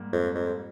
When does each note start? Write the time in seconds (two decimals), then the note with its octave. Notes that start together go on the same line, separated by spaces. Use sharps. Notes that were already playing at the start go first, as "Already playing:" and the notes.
Already playing: G#2 G3 A#3
0.13 F2
0.35 F2